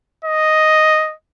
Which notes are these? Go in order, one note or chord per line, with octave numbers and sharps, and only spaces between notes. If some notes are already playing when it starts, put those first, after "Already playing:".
D#5